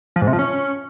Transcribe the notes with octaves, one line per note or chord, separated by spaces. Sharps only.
F3
G#2
C3
F3
C#4